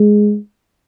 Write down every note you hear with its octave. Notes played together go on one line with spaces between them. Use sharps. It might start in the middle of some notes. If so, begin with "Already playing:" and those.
Already playing: G#3